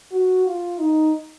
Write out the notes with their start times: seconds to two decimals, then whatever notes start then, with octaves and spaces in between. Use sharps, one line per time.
0.12 F#4
0.46 F4
0.79 D#4